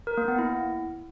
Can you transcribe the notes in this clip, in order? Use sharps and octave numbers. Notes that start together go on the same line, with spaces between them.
A#4
A#3
B3
E4